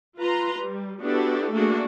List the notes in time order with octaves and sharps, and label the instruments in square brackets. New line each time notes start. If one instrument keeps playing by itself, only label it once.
[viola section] F4 B4 A#5 C6
G3
B3 D4 E4 F#4 G4 A4
A3 A#3 D4 F#4 G#4